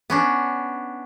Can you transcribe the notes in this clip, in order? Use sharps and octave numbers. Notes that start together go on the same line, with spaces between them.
B3 C#4 D4